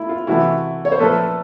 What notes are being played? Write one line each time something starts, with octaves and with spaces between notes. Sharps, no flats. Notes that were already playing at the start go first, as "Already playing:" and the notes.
Already playing: A3 E4
F4
C3 E3 A3 E4 F#4
C#5
C5
A#2 F3 A3 A4 B4